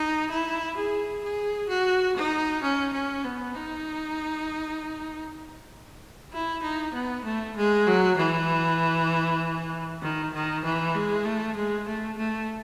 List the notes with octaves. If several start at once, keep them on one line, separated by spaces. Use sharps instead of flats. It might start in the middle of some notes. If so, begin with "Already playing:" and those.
Already playing: D#4
E4
G#4
G#4
F#4
D#4
C#4
C#4
B3
D#4
E4
D#4
B3
A3
G#3
F#3
E3
D#3
D#3
E3
G#3
A3
G#3
A3
A3